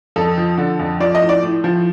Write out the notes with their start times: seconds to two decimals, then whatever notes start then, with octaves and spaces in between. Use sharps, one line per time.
0.16 F2 A4
0.38 F3
0.58 D3
0.79 F2
1.00 F3 D5
1.15 D#5
1.22 A2
1.29 D5
1.43 A2
1.64 F3